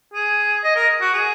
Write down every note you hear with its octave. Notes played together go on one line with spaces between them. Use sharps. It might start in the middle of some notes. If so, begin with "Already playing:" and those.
G#4
D#5
A#4
F#4
G#4